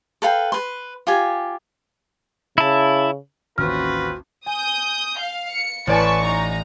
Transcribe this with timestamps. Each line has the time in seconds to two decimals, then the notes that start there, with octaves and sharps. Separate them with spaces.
0.22 A4 B4 F5 G5
0.52 B4 C6
1.07 F4 G4 G#5
2.58 C#3 E4 A5
3.58 A1 D#2 C4 C#4 F4 F#4 B4 F6
4.46 G#5 D#6 G6
5.19 F5
5.51 C#7
5.87 A1 B4 D5 G#5 A5 C#6
6.24 D#4 A#5